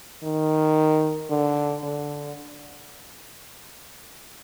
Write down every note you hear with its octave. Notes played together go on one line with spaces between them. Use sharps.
D#3
D3
D3